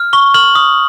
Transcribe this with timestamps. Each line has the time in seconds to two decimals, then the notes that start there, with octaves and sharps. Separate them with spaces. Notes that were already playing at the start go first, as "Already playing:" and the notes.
Already playing: F6
0.13 C#6 G7
0.34 F6 F#7
0.55 D#6